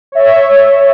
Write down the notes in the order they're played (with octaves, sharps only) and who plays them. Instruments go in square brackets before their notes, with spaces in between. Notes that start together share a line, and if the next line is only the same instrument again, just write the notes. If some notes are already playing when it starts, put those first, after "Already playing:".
[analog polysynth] C#5 E5